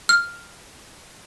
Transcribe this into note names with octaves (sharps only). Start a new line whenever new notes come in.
F6